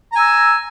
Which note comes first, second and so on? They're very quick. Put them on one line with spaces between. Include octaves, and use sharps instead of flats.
A#5 G#5 E6